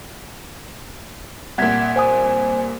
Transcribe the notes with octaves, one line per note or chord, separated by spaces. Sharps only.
C2 A#2 F#5 G#6 B6
C5 G#5 D#6